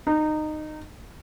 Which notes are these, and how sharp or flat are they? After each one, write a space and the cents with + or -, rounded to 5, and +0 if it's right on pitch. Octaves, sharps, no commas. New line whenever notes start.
D#4 -20